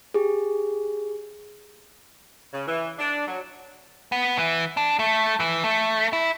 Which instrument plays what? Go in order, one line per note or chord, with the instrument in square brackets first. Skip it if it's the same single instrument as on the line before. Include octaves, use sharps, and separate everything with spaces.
[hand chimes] G4 G#4
[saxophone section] C#3
E3
D4
F#3
[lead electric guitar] B3
E3
D4
A3
E3
A3
E4